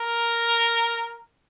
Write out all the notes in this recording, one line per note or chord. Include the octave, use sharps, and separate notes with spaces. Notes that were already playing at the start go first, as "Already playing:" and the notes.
Already playing: A#4